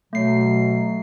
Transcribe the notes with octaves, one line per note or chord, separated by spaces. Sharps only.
B2 F#3 A3 C7